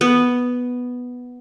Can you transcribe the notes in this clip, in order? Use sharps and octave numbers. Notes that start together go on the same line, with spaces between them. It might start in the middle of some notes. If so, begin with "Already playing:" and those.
B3